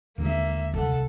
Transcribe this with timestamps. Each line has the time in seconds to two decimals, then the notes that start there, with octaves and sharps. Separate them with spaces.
0.18 D#2 D3 G#3 A#3 E5
0.74 C2 A4 F#5